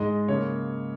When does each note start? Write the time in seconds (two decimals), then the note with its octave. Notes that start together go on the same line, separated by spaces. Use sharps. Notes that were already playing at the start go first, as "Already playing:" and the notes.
Already playing: G#2 G#3 D#5
0.28 C#3 A#3 C#5